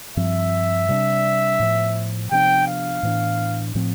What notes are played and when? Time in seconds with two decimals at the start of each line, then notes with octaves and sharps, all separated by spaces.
0.17 G2 F3 C4 E5
0.88 C3 G3 B3 D4
1.60 A2 F3 B3
2.31 C3 F3 B3 D4 G5
2.67 F5
3.03 A2 E3 B3 D4
3.75 A2 F3 C4